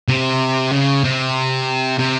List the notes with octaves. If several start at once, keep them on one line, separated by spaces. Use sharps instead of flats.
C3
C#3
C3
C3